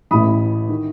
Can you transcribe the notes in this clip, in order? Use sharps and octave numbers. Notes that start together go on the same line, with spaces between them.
A1 A2 E3 B5 D#6
D#3